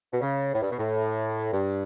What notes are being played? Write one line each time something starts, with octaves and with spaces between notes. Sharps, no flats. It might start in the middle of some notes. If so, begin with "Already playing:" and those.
B2
C#3
A2
G2
B2
A2
G2